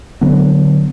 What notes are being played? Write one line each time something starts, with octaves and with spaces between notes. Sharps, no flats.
D3 F#3 B3 D4